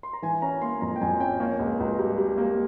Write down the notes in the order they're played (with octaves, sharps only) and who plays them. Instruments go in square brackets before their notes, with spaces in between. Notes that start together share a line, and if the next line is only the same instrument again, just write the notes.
[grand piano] C6
A#5
E3 G#5
C#4 A#5
A#3 C6
F2 A#5
G5
F2 G#5
C#4 G5
A#3 C#5
C#2
C#2
G3
G3
A#3